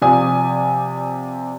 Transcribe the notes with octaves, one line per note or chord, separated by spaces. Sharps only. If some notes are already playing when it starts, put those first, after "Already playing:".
C3 F3 D5 G#5 D#6